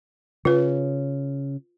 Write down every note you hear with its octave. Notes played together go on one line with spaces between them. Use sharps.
C#3 F4 B4